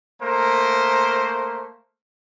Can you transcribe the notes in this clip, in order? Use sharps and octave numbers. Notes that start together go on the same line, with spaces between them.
A3 A#3 A#4 C5